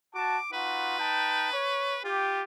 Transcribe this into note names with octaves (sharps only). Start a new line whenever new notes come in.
F#4 A5 D6
D#4 F4 F#4 B4
D#4 G5 A5
C#5
F4 G4